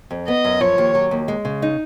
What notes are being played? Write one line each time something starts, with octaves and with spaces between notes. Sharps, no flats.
F2
B3 D#5
F#2
F3 C#5
D#2
F#3
D#2
G#3
C#3
D#4